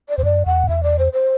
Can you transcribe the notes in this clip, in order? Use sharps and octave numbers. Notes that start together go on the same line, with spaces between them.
D5
E2 C5
F#2 D5
E2 F#5
F#2
E2 E5
D5
C5
C5